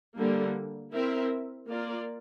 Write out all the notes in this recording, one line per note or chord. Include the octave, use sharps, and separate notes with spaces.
D3 G3 A#3
C4 E4 A#4 E5
A#3 F4 A#4 D5